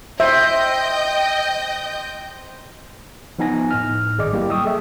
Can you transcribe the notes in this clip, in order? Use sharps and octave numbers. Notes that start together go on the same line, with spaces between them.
C5 D#5 E5 G5 G6
F3 B3 D#4 G#5 A#6
A2 F6
G#1 G#4 D5 D#5 D6
F#3 G3 A#3 E4 G4
G5 C#6 D#6 E6
G#4 A4 D#5 E5